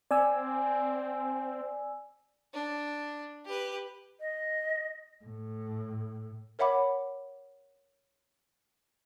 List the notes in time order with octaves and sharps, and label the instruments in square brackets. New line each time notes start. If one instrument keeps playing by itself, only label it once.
[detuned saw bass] C4 [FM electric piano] D5 G#5 E6
[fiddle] D4
G4 B4
[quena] D#5
[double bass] A2
[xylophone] A#4 C#5 E5 F#5 B5 D6